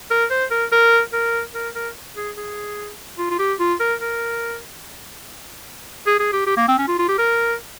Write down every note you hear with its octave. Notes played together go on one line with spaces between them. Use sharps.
A#4
C5
A#4
A#4
A#4
A#4
A#4
G#4
G#4
F4
F4
G4
F4
A#4
A#4
G#4
G#4
G4
G4
A#3
C4
C#4
F4
F4
G4
A#4